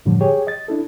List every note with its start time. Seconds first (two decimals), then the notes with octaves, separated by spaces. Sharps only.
0.06 F#2 A2 D3 F3 G3
0.20 G4 G#4 C#5 G5
0.47 D#5 A6
0.68 D4 E4 A4